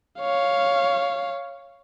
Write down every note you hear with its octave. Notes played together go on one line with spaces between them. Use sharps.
C#5 F5